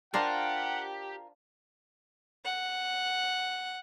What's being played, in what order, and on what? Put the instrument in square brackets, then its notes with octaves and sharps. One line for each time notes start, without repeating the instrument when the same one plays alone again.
[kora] D4 C5 D5 [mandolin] F4 A#4 [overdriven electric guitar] G4 [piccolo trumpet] F#5
[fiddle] F#5